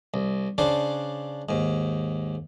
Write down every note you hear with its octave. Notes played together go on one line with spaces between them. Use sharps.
C2
C#3 D4 C5 A5
D#2 G#2